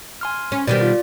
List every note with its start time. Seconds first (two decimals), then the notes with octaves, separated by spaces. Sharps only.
0.21 G#5 C6 F6
0.52 C#4
0.67 B2 D#3 G3 D5
0.81 F4